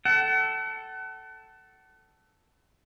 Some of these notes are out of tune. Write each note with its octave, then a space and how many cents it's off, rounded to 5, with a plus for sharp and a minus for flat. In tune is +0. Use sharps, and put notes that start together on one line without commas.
A4 +0 F#5 +40